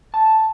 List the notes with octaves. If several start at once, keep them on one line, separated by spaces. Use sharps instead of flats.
A5